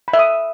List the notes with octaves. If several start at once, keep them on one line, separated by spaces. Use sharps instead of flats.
B5
E5
D#6